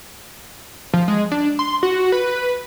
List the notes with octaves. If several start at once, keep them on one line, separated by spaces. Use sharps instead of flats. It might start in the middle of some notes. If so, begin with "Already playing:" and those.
F3
G#3
D4
C6
F#4
B4